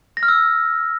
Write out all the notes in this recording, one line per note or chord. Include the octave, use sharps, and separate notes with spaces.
A#6
F6
E6